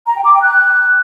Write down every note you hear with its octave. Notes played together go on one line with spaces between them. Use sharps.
A#5
G5
D6
G5
F#6